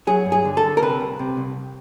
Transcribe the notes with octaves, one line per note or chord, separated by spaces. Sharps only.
F#3 G#4
G2
G#4
D3
A4
D3
A#4
C3 B4
C2
C3
C2